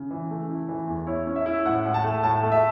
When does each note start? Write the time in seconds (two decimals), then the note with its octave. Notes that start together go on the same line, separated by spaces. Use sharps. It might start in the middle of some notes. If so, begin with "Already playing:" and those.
Already playing: C#3
0.11 E3
0.31 A3
0.50 E4
0.69 E3
0.87 E2
1.07 E4 C#5
1.27 C#4
1.36 E5
1.46 E4
1.65 A2 F#5
1.85 A2
1.94 A5
2.04 A3
2.23 A2 A5
2.43 A3
2.52 E5